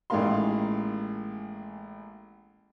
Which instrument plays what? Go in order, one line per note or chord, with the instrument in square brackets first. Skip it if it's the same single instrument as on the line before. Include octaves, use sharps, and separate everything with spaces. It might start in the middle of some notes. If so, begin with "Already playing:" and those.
[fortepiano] A1 D#3 G#3 A#3 F5 C6